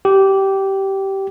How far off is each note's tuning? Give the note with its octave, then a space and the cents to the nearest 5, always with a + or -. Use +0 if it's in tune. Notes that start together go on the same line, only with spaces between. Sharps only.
G4 -15